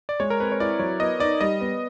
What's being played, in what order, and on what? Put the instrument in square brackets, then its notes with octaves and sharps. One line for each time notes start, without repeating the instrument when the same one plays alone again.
[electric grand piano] D5
[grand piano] G#3 [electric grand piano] C#5
[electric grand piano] A#4
[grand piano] C4 [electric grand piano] B4
[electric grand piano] C#5
[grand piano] E4 [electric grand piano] D5
[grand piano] F#3 [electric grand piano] C#5
[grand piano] B3 [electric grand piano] D#5
[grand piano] D#4 [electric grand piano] D5
[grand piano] G3 [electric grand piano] D#5
[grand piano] B3